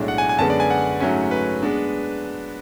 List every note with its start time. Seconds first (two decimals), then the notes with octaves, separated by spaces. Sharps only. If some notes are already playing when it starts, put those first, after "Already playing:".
Already playing: B1 A2 G#3 D4
0.08 F#5
0.18 G#5
0.29 G#5
0.39 F#2 D3 G#3 B3 A5
0.50 D5
0.60 G#5
0.70 F#5
1.00 G#2 F#3 A3 C#4
1.31 B4
1.63 G#3 B3 D4